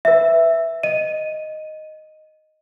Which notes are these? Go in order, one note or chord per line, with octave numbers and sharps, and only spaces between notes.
B4 E5
D#5 D#7